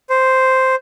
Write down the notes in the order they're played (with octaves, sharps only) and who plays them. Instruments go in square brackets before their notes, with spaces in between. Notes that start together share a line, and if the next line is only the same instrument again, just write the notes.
[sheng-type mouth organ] C5